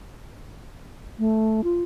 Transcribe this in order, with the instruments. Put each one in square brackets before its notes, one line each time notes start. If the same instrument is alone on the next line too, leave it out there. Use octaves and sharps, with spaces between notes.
[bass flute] A3
F4